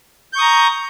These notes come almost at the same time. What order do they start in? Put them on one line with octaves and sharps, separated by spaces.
G6 C#6 D#6 A#5